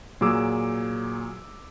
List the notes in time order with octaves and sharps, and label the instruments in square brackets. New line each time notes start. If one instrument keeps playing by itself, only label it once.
[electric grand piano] A#2 F#3 G#4 D6 E6